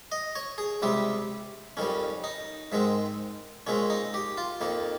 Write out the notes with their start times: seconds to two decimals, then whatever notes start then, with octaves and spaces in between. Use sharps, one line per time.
0.12 D#5
0.35 C#5
0.58 G#4
0.82 C#2 C3 G3 C4 G4
1.77 F2 D#3 G3 C#4
2.24 D#4
2.72 G#2 D#3 G#3 C4
3.67 A#2 G#3 C4 C#4
3.90 D#4
4.14 G4
4.37 F4
4.61 F2 D#3 A#3